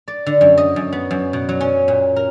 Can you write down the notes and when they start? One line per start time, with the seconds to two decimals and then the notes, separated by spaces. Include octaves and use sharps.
0.08 D5
0.26 D3
0.41 F#2
0.58 D#5
0.76 F#2
0.93 B3
1.11 F#2
1.33 B2
1.49 F#3
1.61 C#4
1.88 A#2
2.16 A#4